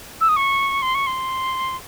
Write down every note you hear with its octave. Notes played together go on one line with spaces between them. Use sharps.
E6
D#6
C#6
C6
C#6
C6